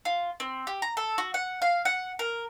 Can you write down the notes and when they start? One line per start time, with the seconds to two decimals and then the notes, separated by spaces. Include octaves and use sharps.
0.05 F4
0.40 C4
0.67 G4
0.82 A#5
0.97 A4
1.18 F#4
1.34 F#5
1.62 F5
1.85 F#5
2.19 A#4